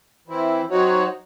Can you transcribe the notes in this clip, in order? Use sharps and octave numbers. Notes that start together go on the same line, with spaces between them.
E3 C4 E4
F#3 C4 D#4 F#4 C#5